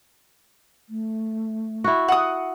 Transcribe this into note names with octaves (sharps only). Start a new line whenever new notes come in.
A3
E4 F#4
F#5 D#6